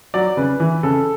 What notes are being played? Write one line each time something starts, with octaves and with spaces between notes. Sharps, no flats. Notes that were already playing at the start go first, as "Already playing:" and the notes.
F#3 D5
C#3 B4
E3
C#3 A4